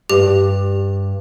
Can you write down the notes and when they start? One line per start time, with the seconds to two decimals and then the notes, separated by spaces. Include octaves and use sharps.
0.10 G2 G4